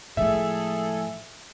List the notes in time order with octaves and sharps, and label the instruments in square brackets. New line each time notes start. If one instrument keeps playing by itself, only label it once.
[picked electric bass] A2 [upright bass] F3 G#3 [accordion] G#4 A4 [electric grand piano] E5